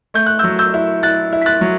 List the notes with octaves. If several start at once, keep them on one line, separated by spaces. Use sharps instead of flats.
A3 G6
F#6
E6 G6
F#3
E6 G6
E4
E4 F#6 A6
E4
B6
F#6 A6
F#3